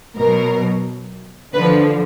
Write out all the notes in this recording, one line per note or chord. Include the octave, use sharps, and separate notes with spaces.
B2 F#3 A#4
D3 F3 B4